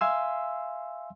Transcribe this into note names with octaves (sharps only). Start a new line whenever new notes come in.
E5 F5 G#5 C6 E6